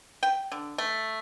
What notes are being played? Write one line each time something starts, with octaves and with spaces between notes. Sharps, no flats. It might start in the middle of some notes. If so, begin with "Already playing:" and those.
G5
D3
A3